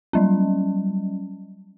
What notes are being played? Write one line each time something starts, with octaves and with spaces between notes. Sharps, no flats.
F#3 G3 C#4